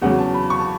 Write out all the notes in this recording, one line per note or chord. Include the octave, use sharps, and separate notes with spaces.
E2 C#3 F#3 F#5
A5
B5
C#6
A5